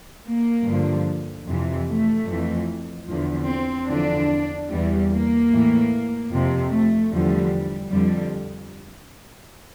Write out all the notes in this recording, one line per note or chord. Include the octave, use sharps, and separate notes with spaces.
A#3
G2 D3 F3
F2 C3 E3
A3
F2 E3
E2 D3 F3
C4
E2 D3 F3 D4
E2 E3 G3
A#3
A2 E3
F2 C3 F3
A3
E2 D3 F3 G3
F2 D3 F3 G3